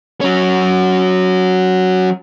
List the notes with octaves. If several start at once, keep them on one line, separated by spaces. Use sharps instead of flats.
F#3 C#4